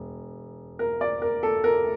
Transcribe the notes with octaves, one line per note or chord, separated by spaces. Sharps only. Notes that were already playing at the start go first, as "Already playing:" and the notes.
Already playing: E1
A#4
D5
A#4
A4
A#4